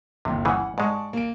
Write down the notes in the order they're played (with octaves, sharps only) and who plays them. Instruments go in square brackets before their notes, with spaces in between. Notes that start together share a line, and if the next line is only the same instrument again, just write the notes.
[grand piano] G1 D#2 [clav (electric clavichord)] C3
[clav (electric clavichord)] C#3 E3 [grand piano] F#5
[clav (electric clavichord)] G#2 G#3 [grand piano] D5 A5 C#6
[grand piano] A#3 D7